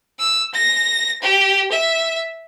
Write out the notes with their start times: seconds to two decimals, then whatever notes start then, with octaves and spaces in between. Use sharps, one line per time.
0.19 E6
0.54 A#6
1.22 G4
1.72 E5